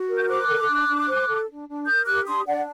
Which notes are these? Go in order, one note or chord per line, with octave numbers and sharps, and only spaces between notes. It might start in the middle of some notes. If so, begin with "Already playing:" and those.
Already playing: F#4
A#4
G6
C5 D6 F#6
A4
D4
D4
C5
A4
D4
D4
A#4 D#6 G6
G4 D6 F#6
D4 C6 D#6
D4 D5 F#5